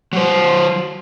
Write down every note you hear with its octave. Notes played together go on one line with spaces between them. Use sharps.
F#3 C5